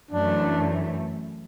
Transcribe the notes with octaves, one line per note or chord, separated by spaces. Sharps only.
F#2 E3 A3 D4